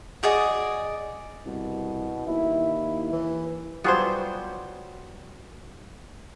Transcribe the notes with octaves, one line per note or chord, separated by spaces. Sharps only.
F#4 G#4 D5 D#5
C2 B2
D#2 E4
E3
F#3 G3 B3 F4 G#4 C5